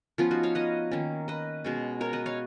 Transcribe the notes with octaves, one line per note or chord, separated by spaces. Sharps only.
F3 B3 C#4 F4
D#4 F#4
C#5 F5
B4 D#5
D#3 A#3 C#4
B4 D#5
B2 G#3 C#4
A#4 C#5
B4 D#5
C#5 F5